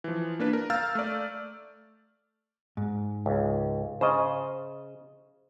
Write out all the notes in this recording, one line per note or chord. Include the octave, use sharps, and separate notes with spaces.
E3 F3
A#3 D4 B4
A#4
F5 A#5 E6 F6 G6 A6
A3 D5
G#2
C#2
C#3 C5 D#5